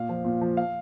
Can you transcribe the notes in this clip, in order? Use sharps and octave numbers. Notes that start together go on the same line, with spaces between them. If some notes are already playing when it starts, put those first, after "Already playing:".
Already playing: A#2 F5
F3
A#2
F3
F5